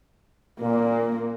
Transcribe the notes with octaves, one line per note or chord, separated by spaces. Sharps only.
A#2 A#3